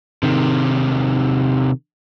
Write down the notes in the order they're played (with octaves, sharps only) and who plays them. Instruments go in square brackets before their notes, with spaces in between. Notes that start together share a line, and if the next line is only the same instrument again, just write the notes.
[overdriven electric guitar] C3 D#3